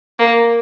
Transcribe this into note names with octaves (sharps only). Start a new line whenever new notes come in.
A#3